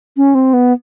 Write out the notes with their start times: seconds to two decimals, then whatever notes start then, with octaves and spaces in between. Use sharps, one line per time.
0.17 C#4
0.35 C4
0.53 B3